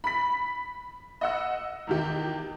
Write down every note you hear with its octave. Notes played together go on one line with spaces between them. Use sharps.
B5 B6
D#5 F#5 E6
E2 D#3 G4